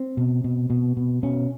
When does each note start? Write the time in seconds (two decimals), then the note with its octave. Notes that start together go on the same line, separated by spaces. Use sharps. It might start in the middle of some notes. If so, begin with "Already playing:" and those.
Already playing: C4
0.17 B2
0.44 B2
0.70 B2
0.97 B2
1.23 B2 C#4